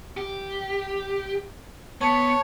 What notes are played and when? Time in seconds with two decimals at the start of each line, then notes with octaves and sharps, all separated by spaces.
0.17 G4
2.01 B3 C#5 A5